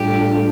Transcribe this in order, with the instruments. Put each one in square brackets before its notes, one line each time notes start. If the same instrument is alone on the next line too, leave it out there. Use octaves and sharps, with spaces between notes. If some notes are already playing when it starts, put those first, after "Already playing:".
Already playing: [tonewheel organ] A2 G3 D4 F4 A4 [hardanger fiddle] G4